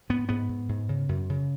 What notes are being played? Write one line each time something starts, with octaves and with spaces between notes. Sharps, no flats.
G#2 B3
G#2 B3
G#2
G#2
C#3
F#2
C#3